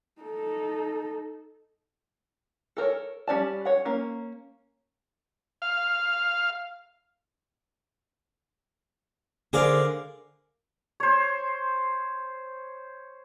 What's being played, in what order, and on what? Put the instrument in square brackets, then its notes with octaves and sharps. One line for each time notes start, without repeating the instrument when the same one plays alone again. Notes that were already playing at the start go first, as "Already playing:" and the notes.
[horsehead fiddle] D#4 A4
[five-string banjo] A4 A#4 C5 C#5
G3 C#4 D5 A5
C#5 F#5
A#3 C#4
[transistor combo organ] F5
[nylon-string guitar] D3 G#4 C5 [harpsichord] A#4 D5 F5
[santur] C5 C#5